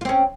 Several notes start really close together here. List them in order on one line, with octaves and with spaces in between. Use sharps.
F4 C4 C#4